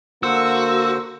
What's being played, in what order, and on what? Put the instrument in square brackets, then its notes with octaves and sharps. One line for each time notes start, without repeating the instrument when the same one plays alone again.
[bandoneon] D3 C5 [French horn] A#3 [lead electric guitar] F#4 [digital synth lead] E6